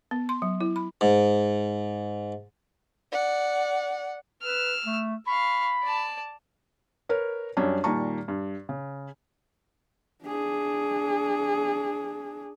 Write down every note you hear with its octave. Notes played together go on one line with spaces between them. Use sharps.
B3
C6
F#3
E4
B5
G#2
D5 F#5
B4 E6 F6
A3
F5 B5 C#6
D5 A5
A#4 B4 C#5
F#2 G3 C#4 D4
A#2 D#3 G3 A5 A#5 C#6
G2
C#3
D4 G#4